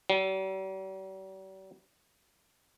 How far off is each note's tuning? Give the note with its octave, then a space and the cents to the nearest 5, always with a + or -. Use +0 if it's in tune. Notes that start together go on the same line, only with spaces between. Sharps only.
G3 -45